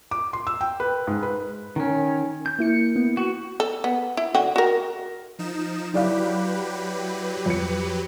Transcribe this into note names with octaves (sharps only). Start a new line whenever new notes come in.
D6
C6
E6
G5
B4
G#2
B4
D#3 C#4
G6
A#3 E4 C#7
B3
F#4
A4
B3
E4
D3 F#4 G5
F#4 A#4
F3 D#4 E7
F#3 E4 G4 B4 D5 F5
F2 C#7